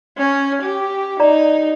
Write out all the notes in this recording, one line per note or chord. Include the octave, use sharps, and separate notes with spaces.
C#4
G4
D#4 D5 A#5